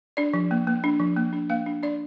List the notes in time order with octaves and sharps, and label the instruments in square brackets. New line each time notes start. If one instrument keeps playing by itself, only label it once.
[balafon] D4 D5
F3
A#3
A#3
D4
F3
A#3
D4
A#3 F5
D4
D4 D5